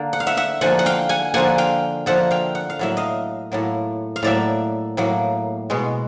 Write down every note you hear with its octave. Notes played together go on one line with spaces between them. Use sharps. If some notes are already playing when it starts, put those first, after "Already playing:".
Already playing: D3 A#3
F#5
F5
E5 F#5
E5 F#5
D3 F3 A#3 F#5 G#5
F#5
F5 G5
F#5 G#5
D3 F3 A#3 F#5 G#5
F5 G5
D3 F3 A#3 E5 F#5
F5 G5
F#5
F5
A2 F#3 A#3 E5
D#5 F5
A2 F#3 A#3
F5
A2 F#3 A#3 D5 E5
A2 F#3 A#3
B2 G#3